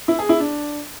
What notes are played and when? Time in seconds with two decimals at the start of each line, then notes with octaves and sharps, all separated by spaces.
0.08 E4
0.19 G#4
0.29 E4
0.40 D4